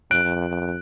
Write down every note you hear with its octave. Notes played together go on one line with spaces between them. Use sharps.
F2 F#6 D7